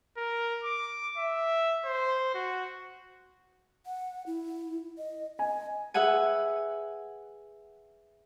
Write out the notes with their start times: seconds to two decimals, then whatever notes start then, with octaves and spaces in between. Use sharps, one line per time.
0.17 A#4
0.63 D6
1.18 E5
1.85 C5
2.34 F#4
3.86 F#5
4.26 E4
4.98 D#5
5.39 D#5 G#5
5.94 G#4 B4 E5 F#5 G#5